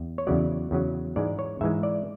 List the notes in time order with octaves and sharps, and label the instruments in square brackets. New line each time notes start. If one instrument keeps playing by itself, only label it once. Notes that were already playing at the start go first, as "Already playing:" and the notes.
Already playing: [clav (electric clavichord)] E2
C#5
E2 C#3 F#3 D5
E2 C#3 F#3
G#2 E3 G#3 D5
C#5
G#2 E3 G#3 E5
D5